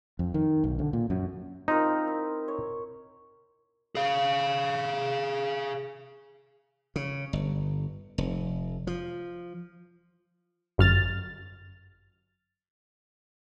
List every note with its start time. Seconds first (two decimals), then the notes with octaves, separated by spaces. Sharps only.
0.19 F2
0.34 D#3
0.64 B1
0.79 D3
0.93 A#2
1.10 F#2
1.68 C4 D#4 F4 A#4
2.07 E4
2.48 C#5
3.95 G#4 F5
6.96 C#3
7.33 G1
8.18 F1
8.87 F3
10.78 G1 F#2 F6 A6